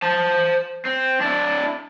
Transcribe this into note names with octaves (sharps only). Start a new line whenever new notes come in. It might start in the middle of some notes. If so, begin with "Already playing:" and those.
C5 A5
C4
D4 E4